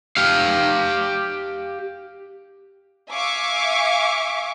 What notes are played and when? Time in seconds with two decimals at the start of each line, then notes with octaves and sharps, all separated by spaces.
0.17 G4 F5
3.11 E5 F5 G#5 C#6 D6